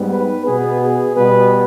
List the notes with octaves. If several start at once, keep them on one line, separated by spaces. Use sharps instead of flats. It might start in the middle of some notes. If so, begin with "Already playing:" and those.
Already playing: G#2 G3 B3
B4
B2 B3 G#4
G#4
B2 G3 B3 B4